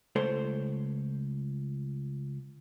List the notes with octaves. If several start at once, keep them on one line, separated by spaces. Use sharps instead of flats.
C#2 A3 A4 C5 C#5 C6